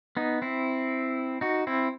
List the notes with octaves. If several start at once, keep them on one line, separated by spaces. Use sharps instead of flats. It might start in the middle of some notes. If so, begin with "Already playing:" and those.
B3 D#4
C4 E4
D#4 F#4
C4 E4